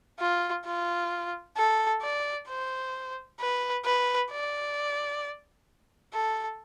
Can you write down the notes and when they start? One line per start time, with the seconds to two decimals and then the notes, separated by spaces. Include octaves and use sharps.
0.19 F4
0.66 F4
1.57 A4
2.02 D5
2.49 C5
3.40 B4
3.85 B4
4.31 D5
6.13 A4